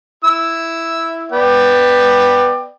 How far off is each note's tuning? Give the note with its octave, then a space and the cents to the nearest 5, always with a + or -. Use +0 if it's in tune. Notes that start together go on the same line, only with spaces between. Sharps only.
E4 +0 E6 +0
B3 +0 D5 +20 G5 +0